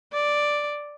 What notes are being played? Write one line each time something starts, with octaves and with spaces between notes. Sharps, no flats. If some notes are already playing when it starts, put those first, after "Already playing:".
D5